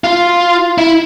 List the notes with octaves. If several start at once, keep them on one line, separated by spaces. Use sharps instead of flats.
F4
E4